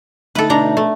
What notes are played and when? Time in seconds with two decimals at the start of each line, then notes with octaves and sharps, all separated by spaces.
0.35 D3 A3 D#4 A4 B4
0.50 B2 D4 A#5
0.77 A3